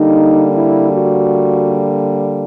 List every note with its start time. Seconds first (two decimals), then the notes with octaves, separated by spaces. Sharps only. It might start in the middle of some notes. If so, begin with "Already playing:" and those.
Already playing: D3 G3 A#3 D#4
0.55 E4
0.90 F#4